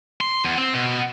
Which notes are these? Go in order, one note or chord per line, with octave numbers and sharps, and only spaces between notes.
C6
E2
C4
B2